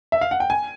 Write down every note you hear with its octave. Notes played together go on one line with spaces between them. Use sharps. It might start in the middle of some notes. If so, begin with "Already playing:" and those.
E5
F5
F#5
G5
G#5